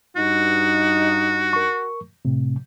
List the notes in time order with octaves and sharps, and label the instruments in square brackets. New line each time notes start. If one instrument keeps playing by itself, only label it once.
[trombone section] G2 D#4 [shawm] F#4
[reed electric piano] A#4 C#6
A2 C3